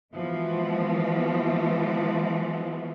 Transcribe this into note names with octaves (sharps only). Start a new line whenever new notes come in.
E3 F3 G#3 B3 F#4